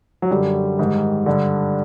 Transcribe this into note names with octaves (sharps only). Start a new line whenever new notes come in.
F#3
F#2 D3 G3
G#2 D#3
G2 D3